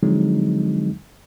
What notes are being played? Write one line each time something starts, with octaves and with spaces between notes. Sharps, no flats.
D3 F3 F#3 G#3 C4 D#4